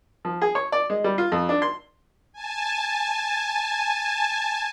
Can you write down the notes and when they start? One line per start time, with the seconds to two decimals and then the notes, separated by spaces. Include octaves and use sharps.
0.25 F3
0.42 G#4
0.55 C#5
0.72 D5
0.90 G#3
1.04 G3
1.18 F4
1.32 F2
1.49 D4
1.62 C6
2.33 G#5 A5